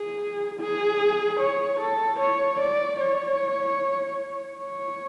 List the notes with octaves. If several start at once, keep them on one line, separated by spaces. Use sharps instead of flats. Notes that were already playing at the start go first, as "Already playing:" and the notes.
Already playing: G#4
G#4
C#5
A4
C#5
D5
C#5
C#5